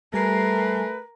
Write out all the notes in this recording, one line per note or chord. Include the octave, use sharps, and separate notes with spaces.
G3 A3 A#4 B4 G#5 C7